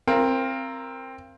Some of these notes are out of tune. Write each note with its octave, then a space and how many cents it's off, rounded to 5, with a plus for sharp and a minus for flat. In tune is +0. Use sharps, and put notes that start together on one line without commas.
C4 +15 F4 -30 A#4 +0